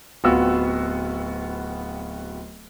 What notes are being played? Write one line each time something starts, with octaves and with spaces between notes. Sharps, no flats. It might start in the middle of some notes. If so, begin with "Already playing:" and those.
D1 B3 C4 F4 F#4 E6